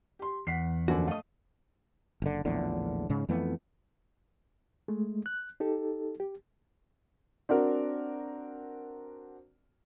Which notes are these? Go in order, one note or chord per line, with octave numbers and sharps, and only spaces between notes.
G4 C6
E2 F#5 B6 C7
F#2 A#2 D3 F3 F#4
A3 D#5 F5 D#6
F#1 D3
A#1 E2 A2 D3
G#2 C#3
F2 E3 A3 B3
G#3 A3
F#6
D#4 G4 A4
G4
C4 D4 F#4 A#4